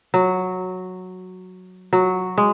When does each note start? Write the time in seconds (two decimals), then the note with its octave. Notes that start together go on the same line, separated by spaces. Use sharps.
0.14 F#3
1.93 F#3
2.38 G#3